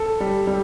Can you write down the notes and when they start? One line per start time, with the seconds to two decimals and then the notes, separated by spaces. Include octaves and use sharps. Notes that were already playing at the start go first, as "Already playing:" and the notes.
Already playing: A4
0.20 G3
0.47 G3